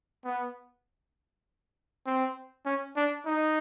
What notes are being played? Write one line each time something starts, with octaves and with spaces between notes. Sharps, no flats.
B3
C4
C#4
D4
D#4